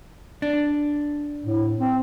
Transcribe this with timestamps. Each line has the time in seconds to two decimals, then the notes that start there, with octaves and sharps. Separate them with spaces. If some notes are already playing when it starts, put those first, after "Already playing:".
0.42 D4
1.46 A2
1.79 C4